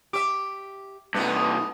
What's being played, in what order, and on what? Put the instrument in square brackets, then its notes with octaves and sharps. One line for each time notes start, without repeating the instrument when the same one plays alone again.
[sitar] G4 E5 [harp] D6
[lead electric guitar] G2 C3 [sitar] A3 B3 D#4